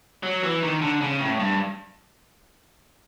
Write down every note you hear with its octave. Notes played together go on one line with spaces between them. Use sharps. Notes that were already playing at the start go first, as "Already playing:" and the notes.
F#3
E3
D#3
D3
C#3
A2
G2